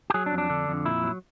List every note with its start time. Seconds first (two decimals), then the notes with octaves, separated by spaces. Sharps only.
0.10 G4
0.14 F#3 G#4
0.26 D4
0.32 F2
0.38 D4
0.50 D3
0.68 F2
0.85 A#2 E4
1.03 F#3